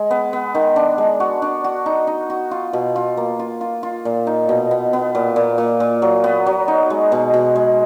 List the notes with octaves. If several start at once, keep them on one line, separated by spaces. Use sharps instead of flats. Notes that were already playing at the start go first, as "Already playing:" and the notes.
Already playing: G#3
B3
B3
D#3
D4
G#3
F#4
D4
F#4
D#4
D#4
F#4
F4
B2
F4
A#3
F4
F4
F4
A#2
D#4
B2
B3
B3
A#2
A#2
A#2
A#2
F#3
B3
F#3
D#4
G#3
B2
B2
G#3